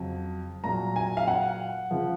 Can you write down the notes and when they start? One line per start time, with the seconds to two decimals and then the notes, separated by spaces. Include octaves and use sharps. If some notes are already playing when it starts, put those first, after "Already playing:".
Already playing: F2 C#3 F#3
0.64 A#2 F#3 A#5
0.96 G#5
1.17 F5
1.28 F#5
1.91 C#3 F3